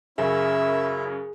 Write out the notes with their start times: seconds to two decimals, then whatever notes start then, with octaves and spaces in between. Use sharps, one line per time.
0.18 F#2 C#3 C#4 E4 G#4 A#4 E5